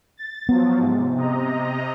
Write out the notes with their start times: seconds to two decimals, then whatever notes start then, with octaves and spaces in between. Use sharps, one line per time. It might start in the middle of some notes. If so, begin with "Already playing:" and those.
0.17 A6
0.49 F3 F#3 B3
0.79 G#2 C3
1.16 C3 D#5 A#5